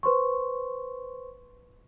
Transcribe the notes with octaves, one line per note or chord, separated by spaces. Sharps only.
B4 C5 C6 C#6